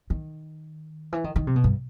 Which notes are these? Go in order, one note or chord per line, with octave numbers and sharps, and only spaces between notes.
D#3
E3
D#3
D#3
C3
B2
G2